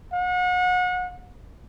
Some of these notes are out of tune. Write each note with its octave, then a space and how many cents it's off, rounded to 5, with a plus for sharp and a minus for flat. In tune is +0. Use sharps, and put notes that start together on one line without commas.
F#5 -35